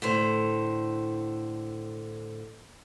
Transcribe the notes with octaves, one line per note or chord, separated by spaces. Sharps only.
A2 D3 C5